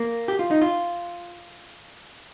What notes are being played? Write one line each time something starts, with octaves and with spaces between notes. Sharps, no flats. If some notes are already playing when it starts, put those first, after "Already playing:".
Already playing: A#3
G4
F4
D#4
F4